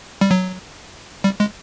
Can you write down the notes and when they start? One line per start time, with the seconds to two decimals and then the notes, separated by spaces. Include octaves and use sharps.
0.21 G3
0.31 F#3
1.24 G3
1.40 G#3